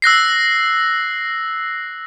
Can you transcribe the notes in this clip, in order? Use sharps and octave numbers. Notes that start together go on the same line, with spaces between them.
E6 F#6 A#6 C7